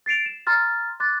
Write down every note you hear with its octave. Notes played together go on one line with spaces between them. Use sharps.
A6 C7 D7 F7
E7
A#5 C6 F6 A6
C6 D6 F#6 A6